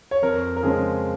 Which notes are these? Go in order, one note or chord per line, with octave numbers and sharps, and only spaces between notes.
C#5
F2 A#4
A#4
C#3 F3 G#3 C#4 G#4